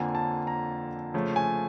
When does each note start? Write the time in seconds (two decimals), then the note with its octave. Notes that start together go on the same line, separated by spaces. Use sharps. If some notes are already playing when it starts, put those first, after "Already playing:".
Already playing: F2 D3 F3 A#3 G#5
0.15 A5
0.47 A#5
1.14 C#3 F3 A3
1.36 G#5